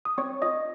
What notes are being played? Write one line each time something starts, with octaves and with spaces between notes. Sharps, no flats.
D#6
C4 C#5 C#6
F4 D#5 D#6